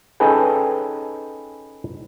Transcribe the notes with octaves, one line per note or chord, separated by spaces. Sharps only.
C#4 D#4 G#4 A4 B4 G5